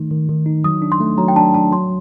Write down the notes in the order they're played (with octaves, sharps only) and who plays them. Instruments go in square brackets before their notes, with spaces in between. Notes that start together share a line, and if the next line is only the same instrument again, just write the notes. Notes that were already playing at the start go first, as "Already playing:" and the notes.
Already playing: [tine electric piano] D#3 A3 D#4
D#3
D#3
D#4
[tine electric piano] F#3 [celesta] D#6
[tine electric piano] D4
[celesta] C6
[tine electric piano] A3
[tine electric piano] F#3 [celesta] A#5
[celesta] G5
[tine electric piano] D4 [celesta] A5
[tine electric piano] D4 [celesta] A5
[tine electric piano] F#3 [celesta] C6